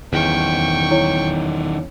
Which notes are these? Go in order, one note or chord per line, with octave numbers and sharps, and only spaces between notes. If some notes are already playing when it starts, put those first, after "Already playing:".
E2 D#3 C#4 G5 C#6
E4 C#5